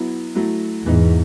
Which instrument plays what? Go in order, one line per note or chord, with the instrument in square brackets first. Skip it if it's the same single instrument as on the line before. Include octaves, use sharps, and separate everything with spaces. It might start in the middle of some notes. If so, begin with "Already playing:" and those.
Already playing: [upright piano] F#3 B3 E4
F#3 A3 E4
[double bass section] E2 G#2 [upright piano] E3 B3 D#4